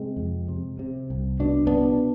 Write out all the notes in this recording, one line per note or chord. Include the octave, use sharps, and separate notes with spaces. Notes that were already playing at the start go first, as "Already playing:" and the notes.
Already playing: C3 G#3 C4
F2
C3
C3
C2
B2 D4
B2 B3 D4